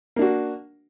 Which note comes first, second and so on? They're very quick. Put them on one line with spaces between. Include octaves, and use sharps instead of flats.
A#3 D4 F#4